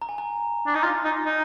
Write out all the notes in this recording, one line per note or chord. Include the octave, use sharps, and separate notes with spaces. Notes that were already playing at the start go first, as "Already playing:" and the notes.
A#5
G#5
A#5
D4
D#4
F4
D#4
D#4